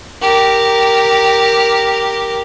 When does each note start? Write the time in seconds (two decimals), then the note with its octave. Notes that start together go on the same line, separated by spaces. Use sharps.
0.22 G4 A#4